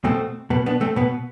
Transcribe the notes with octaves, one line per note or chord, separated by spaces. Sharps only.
B2 A3 C4
B2 B3
B3 D4
A3 C4
B2 B3